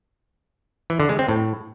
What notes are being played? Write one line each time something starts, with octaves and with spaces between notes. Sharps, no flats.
E3
D3
G#3
C4
A2